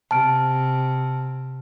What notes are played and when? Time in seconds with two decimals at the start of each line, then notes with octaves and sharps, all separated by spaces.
0.11 C3 A5 F6 D7